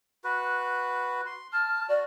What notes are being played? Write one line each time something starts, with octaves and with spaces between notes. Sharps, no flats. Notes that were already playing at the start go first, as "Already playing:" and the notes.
F#4 B4
C6
A5 F6
F#4 D5